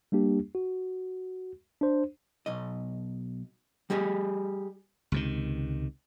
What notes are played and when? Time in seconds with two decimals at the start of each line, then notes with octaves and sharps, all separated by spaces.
0.12 G3 A#3 D4 G4
0.55 F#4
1.81 D4 C5
2.46 B1 D#5
3.90 G3 G4 G#4 D#5
5.12 C#2 C3 D#3